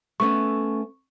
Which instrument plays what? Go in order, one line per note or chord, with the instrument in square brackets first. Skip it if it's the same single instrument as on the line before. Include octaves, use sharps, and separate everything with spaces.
[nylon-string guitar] A3 B3 C#4 [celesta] C#6